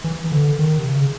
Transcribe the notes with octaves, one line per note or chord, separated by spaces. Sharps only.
E3
D3
D#3
C3
C#3